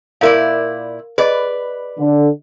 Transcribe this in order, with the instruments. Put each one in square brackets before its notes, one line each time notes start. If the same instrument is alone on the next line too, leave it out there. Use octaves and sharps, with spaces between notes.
[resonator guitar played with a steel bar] A#2 E4 D5 [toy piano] A#4 F5
[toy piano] G#4 D#5 [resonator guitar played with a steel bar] B4 D5
[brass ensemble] D3